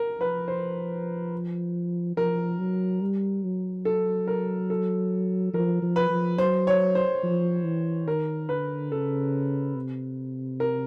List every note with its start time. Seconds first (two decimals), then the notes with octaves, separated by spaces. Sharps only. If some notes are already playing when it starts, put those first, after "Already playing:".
Already playing: A#4
0.20 F3 B4
0.48 C5
2.17 F3 A#4
2.59 F#3
3.01 G3
3.43 F#3
3.85 A4
4.28 A#4
4.70 A4
5.54 F3 A#4
5.82 F3
5.96 B4
6.10 F3
6.38 F#3 C5
6.67 C#5
6.95 C5
7.23 F3
7.64 E3
8.08 D#3 A#4
8.49 D3 B4
8.92 C#3 A4
9.76 C3
10.60 A#4